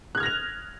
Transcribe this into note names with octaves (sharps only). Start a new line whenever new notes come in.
F6 F#6 G#6 A#6 F7